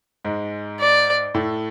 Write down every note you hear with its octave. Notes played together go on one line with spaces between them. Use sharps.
G#2 G#3
D5
A2 A3